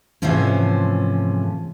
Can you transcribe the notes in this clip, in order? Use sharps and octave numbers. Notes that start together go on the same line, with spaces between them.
G#2 C3 E3 F3 A3 C#4